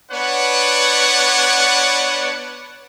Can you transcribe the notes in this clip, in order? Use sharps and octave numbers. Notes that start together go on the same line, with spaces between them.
B3 D4 B4 C#5 D5 F#5